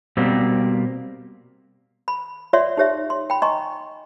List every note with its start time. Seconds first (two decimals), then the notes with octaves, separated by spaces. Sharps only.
0.17 B2 G3 A#3 C4
2.08 B5
2.53 F4 C#5 D5 E5 F#5 C6
2.77 D#4 G4 C#5 E5
3.10 C6
3.30 G5 B5
3.42 D#5 G#5 A#5 C6 C#6